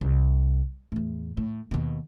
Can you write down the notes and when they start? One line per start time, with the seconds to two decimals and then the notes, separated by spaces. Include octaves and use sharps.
0.01 C2
0.92 E2 A2
1.37 A2
1.71 D#2 B2